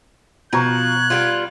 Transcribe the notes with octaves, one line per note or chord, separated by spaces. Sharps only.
B2 F3 A#5 C#6 F#6 G#6
G3 B3 F4